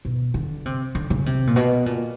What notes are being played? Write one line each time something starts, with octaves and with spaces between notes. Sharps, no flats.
B2
D3
C3
D3
C#3
C3
A#2
B2
A#2